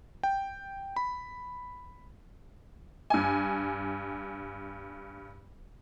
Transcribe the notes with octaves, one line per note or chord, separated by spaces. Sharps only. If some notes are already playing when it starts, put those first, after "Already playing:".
G5
B5
G2 G#5